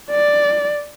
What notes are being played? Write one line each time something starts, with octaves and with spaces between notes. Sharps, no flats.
D5